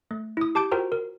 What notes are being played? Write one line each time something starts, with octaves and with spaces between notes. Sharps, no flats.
A3
E4 D#6
G4 A5 D6 G6 D7
F4 F#4 A#4 C5 G5 A#5
A#4